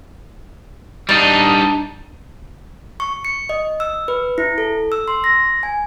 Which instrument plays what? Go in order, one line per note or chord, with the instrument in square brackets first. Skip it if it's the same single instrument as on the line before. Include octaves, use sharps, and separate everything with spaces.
[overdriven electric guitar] G3 D#4 [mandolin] D4
[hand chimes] C#6
C#7
D#5
E6
B4
E4
A4
E6
C6
A#6
G#5